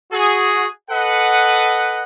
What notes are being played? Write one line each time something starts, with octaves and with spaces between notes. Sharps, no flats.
F#4 G#4
A4 B4 D#5 F#5